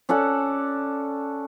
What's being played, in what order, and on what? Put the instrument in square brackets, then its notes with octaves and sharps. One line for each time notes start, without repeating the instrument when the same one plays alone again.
[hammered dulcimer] C#4 A4 D5 F#5